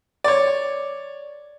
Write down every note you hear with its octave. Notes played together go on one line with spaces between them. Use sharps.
C#5 D5